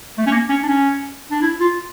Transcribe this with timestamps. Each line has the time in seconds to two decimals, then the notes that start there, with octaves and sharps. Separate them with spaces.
0.18 A3
0.26 C#4
0.31 A#3
0.49 C#4
0.63 D4
0.68 C#4
1.31 D4
1.42 E4
1.61 F4